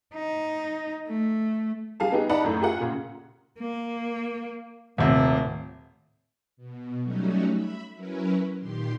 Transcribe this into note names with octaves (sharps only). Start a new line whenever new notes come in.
D#4
A3
G3 G#4 F5 A5
B3 D#4 G4 G#4
D#4 D5 F#5 A5 B5
F#2 A2
F4 G4 G#4 A#4 F#5
A#2 C#3
A#3
D#1 A2 C3
B2
F#3 G3 A3 C#4 D#4 F#4
E5 B5
F#3 C#4 E4 A#4 B4
A#2 D#3 G4 C6